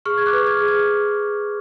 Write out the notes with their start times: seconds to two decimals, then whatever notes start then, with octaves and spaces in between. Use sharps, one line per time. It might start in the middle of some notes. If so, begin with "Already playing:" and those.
0.05 G#4 C#6 F6
0.18 G#6
0.26 D6 F#6
0.33 B4
0.47 F6 G#6
0.61 G#4
0.68 F6 G#6